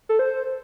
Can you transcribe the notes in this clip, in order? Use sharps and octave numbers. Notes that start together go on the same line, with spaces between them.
A4
C5